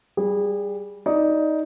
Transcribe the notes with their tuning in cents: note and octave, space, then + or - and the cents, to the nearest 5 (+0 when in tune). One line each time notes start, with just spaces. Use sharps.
G3 +0 G#4 -25
D#4 +10 D5 +0